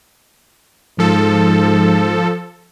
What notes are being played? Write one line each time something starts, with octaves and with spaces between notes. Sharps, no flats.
G#2 F3 A4